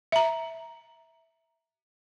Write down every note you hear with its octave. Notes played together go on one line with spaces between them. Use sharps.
E5 A#5